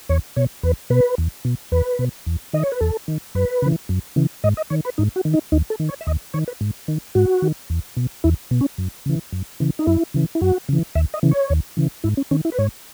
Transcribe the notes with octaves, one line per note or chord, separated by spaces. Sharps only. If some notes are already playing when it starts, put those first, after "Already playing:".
E2 C#5
B2 C#5
E2 B4
B2 B4
E2
B2
E2 B4
B2
E2
D#3 D#5
C#5
B4
E2 A4
D#3
F#2 B4
C#3 E3
F#2
C#3 E3
G#2 D#5
D#5
D#3 C#5
B4
G#2 D#4
F#4
D#3
D#4
D#2 D#4
A4
D#3
C#5
E5
D#2 D#5
D#3 C#5
B4
G#2
D#3
G#2 F#4
D#3
E2
B2
E2 E4
B2
C#4
F#2
C#3 E3
F#2
C#3 E3
D#4
F#2 E4
C#3 E3
E4
F#2 F#4
C#3 E3
D#2 E5
D#5
C#3 E3
C#5
D#2
C#3 E3
G#2 E4
C#4
D#3 C#4
E4
B4
G#2 C#5